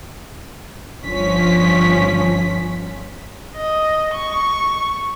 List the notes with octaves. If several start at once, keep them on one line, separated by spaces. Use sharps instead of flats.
G1 F3 C#4 B6
D#5
C#6